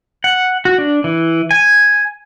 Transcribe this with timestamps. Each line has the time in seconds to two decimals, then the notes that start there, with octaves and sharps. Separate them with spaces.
0.24 F#5
0.65 F#4
0.78 D4
1.04 E3
1.51 G#5